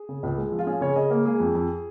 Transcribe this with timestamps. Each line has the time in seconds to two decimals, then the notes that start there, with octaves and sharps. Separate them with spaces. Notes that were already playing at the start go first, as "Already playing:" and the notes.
Already playing: G#4
0.09 C#3
0.23 C#2
0.38 G#3
0.52 F3
0.59 F4
0.67 C#4 G#4
0.81 C#3 C#5
0.96 C#3 D#5
1.10 A#3
1.25 G#3 G#4
1.40 F2
1.55 F2